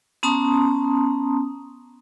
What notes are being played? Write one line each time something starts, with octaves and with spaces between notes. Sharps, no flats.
B3 C#4 A5 A#5 C6 D#6